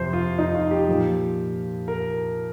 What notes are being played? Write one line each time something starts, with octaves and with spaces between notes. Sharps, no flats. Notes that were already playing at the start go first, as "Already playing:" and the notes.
Already playing: F2 C3 F3 C5
F4
D#4
F4
G4
A#2 F3
A#4